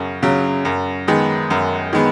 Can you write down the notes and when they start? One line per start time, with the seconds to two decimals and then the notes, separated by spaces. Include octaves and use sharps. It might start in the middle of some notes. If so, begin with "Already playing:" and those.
Already playing: F#2 C#3
0.23 C#3 F#3
0.65 F#2
1.08 D#3 G#3 B3
1.50 F#2
1.93 D#3 G#3 B3